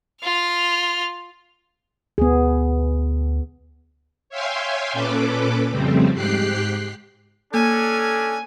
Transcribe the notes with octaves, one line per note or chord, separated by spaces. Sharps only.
F4 F6
D2 B3 G#4
C#5 E5 F5 G5 G#5 C6
A#2 C#4 A4 B4 D6
F2 C#3 F3 G3 A3 C4
G#2 G4 G5 F#6 C7
A#3 C#4 D4 A4 G#5